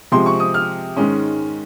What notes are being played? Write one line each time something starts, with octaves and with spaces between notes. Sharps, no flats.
C3 F3 G#3 C4 C6
C#6
D#6
F6
G#2 D#3 G#3 C#4